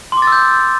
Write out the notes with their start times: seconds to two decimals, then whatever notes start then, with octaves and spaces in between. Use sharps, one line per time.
0.12 C6
0.17 D6
0.22 A6
0.27 E6
0.32 G6